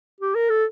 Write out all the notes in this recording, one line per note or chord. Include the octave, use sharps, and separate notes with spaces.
G4
A#4
A4